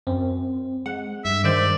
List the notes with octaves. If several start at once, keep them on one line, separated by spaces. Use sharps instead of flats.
F#2 C4
G#3 F#5
G2 E5
D#3 G#3 C5 D5